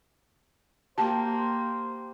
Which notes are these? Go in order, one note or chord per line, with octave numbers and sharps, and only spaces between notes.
A#3 G4 C5 A5